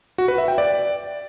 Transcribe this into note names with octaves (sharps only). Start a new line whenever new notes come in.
F#4
B4
E5
G5
D5